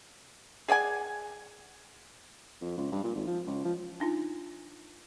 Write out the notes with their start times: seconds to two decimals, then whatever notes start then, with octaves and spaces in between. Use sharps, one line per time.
0.68 G#4 D5 F#5 G#5
2.61 F2
2.78 C#2
2.91 G2
3.04 A#2
3.15 G#1
3.27 F3
3.47 C#2
3.65 F3
4.00 D4 D#4 F4